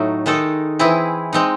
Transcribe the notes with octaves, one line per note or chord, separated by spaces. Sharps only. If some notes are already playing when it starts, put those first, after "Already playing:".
Already playing: A2 F#3 A3 D#4
D#3 G#3 D#4 A4
E3 C4 E4 G#4
G#3 C4 D#4